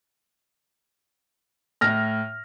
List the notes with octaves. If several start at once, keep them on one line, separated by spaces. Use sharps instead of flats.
A2 F6 A#6